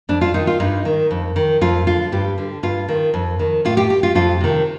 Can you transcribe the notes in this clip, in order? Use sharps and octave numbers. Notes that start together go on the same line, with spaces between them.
F2 D4
F4
D#3 D#4
F4
G2 D#4
D#3
F2
D#3
F2 F4
D3 F4
G2 G4
D3
G2 F4
D#3
F2
D#3
A2 F4
G4
G4
F4
F2 F4
C3 D#3